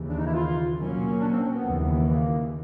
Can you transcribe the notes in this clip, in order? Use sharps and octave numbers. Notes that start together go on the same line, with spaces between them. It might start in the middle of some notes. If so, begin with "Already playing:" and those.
Already playing: D#2 C#3 E3
D4
D#4
E4
F4
B2 F#3 A#3 C#4
D4
C4
C4
B3
D#2 C#3 E3
A#3